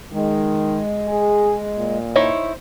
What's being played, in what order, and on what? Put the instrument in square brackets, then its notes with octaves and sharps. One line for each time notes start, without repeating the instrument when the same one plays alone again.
[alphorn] D#3 [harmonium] G#3
[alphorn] G#4
A#2
[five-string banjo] D#4 E4 C#5 [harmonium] C5